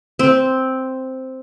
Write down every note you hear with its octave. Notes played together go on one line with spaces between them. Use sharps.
C4